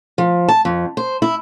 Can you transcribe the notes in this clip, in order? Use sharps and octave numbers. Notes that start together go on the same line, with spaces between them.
F3
A5
F2
C5
E4